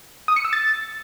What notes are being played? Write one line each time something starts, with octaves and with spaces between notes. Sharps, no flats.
D#6
C#7
E6
A6